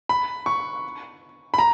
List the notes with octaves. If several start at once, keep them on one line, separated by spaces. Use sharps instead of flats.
B5
C#6
B5
A#5